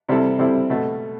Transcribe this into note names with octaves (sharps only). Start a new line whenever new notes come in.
C3 G3 C4 E4 A4
C3 G3 C4 E4 A4
B2 A3